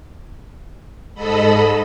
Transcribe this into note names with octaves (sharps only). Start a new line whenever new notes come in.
G#2 A4 D#5 B5 E6